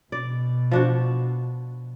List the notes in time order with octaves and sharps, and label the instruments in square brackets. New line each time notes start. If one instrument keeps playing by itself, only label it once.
[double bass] B2 [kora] D5
[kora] F3 D4 F#4